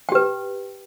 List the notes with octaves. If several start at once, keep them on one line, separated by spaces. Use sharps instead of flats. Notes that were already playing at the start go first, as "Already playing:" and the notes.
G4 B4 G5